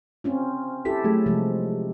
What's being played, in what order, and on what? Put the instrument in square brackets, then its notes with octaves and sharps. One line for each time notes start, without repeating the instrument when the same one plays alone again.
[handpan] C4 C#4 F4
[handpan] E4 G4 A4 [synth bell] B6
[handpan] F#3 [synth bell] A3 G#4
[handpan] C3 F3 G#3